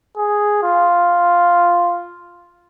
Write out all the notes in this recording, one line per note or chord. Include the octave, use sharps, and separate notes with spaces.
G#4
F4